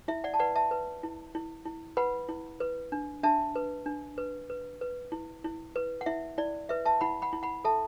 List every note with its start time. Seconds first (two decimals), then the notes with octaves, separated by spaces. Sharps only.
0.08 E4 E5
0.24 D5 F#5
0.34 A5
0.39 B4 D5 F#5
0.56 E5 A5
0.71 B4
1.03 E4
1.35 E4
1.65 E4
1.97 B4 F#5 B5
2.29 E4
2.60 B4
2.92 D4
3.23 D4 E5 A5
3.55 B4
3.86 D4
4.18 B4
4.50 B4
4.81 B4
5.12 E4
5.44 E4
5.76 B4
6.01 F#5
6.06 E4 E5
6.38 E4 D5
6.69 B4 E5
6.85 E5 A5
7.01 E4 F#5 B5
7.22 F#5 B5
7.33 E4
7.43 F#5 B5
7.64 A4 E5 A5